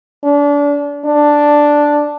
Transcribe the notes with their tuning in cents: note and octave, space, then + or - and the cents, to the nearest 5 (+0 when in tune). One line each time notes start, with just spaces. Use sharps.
D4 -30
D4 +0